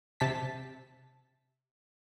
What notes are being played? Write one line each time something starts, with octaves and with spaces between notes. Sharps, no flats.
C3 A5 B6